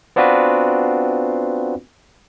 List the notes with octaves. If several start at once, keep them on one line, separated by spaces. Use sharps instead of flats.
B3 C4 D4 F4 F#4 B4